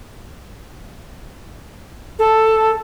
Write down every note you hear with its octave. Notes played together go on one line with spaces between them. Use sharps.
A4